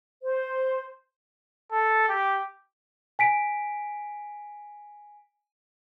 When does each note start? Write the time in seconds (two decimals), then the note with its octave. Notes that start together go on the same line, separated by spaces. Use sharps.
0.23 C5
1.72 A4
2.09 G4
3.19 G#5 B6 D7